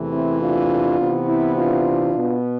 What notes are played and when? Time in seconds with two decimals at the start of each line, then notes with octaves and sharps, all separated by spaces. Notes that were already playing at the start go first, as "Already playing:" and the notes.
Already playing: E2 C3 E3 A3
0.12 C4 E4
0.41 D4 F4
1.00 C3 E3 B3
1.28 C4 E4
1.57 D4 F4
2.16 B2 B3